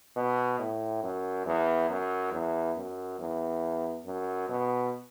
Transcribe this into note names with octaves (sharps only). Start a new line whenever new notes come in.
B2
A2
F#2
E2
F#2
E2
F#2
E2
F#2
B2